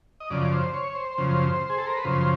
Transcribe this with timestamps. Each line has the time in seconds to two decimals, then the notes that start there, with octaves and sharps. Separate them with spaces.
0.20 D#5
0.30 F#2 C#3 F3 D5
0.52 C5
0.74 C#5
0.95 C5
1.18 F#2 C#3 F3
1.70 G#4
1.78 A4
1.87 A#4
1.96 B4
2.05 F#2 C#3 F3 C5